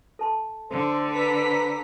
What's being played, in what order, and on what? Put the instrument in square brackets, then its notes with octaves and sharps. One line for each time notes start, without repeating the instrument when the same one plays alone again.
[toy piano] A4 A5 C6
[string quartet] D3 [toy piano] A4 [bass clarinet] C5
[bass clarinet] B4 [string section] C5 A#5 B6